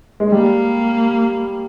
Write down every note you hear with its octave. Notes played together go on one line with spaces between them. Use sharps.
G#3
G3 A#3